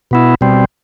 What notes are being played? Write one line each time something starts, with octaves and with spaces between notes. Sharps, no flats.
B2 B3 E4
B2 G3 C4